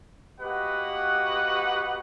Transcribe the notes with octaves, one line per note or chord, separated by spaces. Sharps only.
A#3 F#4 G4 B4 D#5 F#5